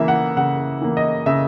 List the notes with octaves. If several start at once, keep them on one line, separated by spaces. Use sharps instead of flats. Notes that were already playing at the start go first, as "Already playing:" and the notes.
Already playing: C#3 E3 A#3 E5
F#5
C#3 F#5
E3 A#3
D#5
C#3 E5